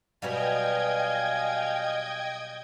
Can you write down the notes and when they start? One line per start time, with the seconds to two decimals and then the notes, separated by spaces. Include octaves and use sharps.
0.22 B2 F#3 G3 D#5 F5 G5 G#5 G#6